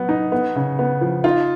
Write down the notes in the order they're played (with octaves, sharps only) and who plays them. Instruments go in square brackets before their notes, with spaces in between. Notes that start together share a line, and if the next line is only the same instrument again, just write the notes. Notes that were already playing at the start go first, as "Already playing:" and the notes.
Already playing: [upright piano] F#3 B3
D#4
B3
C#3
B3
F3
[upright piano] D#4 [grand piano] F4